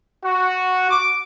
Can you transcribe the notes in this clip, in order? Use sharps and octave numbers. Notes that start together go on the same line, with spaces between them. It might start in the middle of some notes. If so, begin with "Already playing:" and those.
F#4
D6